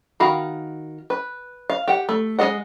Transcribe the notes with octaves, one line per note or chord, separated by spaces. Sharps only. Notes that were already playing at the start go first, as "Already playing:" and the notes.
D#3 F#4 F5 B5
B4
F5
G4 F#5
A3
G#3 E4 G#4 D#5 F#5